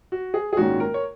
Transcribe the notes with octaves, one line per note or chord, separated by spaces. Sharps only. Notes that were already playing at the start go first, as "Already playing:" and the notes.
F#4
G#4
G#4
A#1 G#2 D#3 G#3 C#4 F#4
A#4
C#5